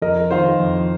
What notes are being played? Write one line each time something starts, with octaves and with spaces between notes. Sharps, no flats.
F2 A#4 D#5
D#3 C5 F5
F2